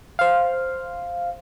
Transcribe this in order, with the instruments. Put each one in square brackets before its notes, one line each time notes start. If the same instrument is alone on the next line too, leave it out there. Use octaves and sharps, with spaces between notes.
[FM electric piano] C5 F5